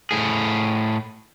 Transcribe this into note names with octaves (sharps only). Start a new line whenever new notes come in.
A2 G#4